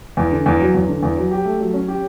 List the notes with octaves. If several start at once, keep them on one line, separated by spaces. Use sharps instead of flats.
E2
D3
E2
F#3
E2
D3
E2
F#3
G4
A3
F#3
C#4
G4